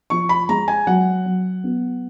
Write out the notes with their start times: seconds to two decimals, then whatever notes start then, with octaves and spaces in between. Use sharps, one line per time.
0.10 F3 C#6
0.29 B5
0.49 G#3 A#5
0.68 G#5
0.87 F#3 F#5
1.26 F#3
1.64 B3